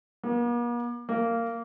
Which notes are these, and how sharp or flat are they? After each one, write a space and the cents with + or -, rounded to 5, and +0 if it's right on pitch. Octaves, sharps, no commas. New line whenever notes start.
A#3 +45
A#3 -15